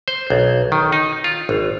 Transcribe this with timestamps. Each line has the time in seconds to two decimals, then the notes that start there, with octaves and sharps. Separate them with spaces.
0.08 C5
0.30 B1
0.72 D#3
0.92 D#4
1.24 F4
1.49 G#1